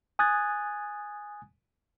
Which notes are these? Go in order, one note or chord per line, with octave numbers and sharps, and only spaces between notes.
G#5 D#6 F#6 G#6 A6